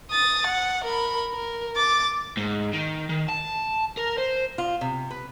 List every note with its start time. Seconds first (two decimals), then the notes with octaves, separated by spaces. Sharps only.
0.11 D#6 A6
0.46 F#5
0.84 A#4 B5
1.33 A#4
1.76 D6 A6
2.37 G#2
2.73 D#3
3.09 D#3
3.28 A5
3.97 A#4
4.18 C5
4.58 F4
4.81 C3
5.10 B4